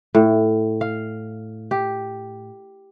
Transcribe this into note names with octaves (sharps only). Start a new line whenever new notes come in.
A2
F5
G4